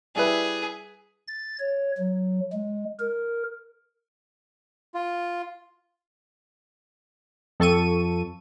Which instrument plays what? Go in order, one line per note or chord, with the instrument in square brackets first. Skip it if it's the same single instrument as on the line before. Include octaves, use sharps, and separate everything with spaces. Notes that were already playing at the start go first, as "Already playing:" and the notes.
[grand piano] G3 E4 B4 [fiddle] G#4
[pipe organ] A6
C#5
F#3
G#3
A#4
[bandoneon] F4
[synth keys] F2 A4 C#6 D#7